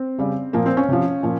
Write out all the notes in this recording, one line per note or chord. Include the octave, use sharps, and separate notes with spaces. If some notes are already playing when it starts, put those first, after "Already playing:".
Already playing: C4
C#3 G3
A#2 F3 A#3
C4
C#4
C3 F3
A#2 F3